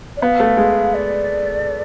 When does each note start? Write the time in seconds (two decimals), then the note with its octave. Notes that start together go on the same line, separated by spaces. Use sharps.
0.16 D5
0.22 B3 F5
0.40 A3
0.57 G#3
0.94 D5